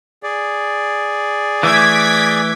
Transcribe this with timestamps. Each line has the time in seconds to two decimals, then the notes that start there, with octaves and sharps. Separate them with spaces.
0.23 G#4 D5
1.63 E3 A3 D6 G#6 B6